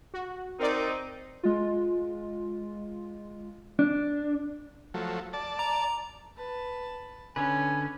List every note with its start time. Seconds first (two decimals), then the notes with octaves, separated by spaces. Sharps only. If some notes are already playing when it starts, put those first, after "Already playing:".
0.14 F#4
0.59 C4 D#4 A#4 D5
1.43 G#3 F4
3.79 D4
4.94 F3 F#3 A3
5.33 D5 A5
5.59 A#5
6.36 B4 A5
7.36 D3 C#4 B4 G#5